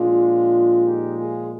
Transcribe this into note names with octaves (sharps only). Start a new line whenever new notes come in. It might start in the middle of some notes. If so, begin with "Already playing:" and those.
Already playing: A#2 F3 G#3 D4 F4
D#4 G4
F4 G#4